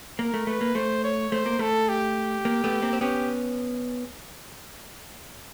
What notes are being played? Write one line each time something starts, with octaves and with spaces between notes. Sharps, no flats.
A#3 A#4
A3
A3 B4
A#3
A3 C5
C#5
A3 C5
A#3
A3 A4
G4
A#3
A3 B3
A#3 C4
C4
B3 C#4 G4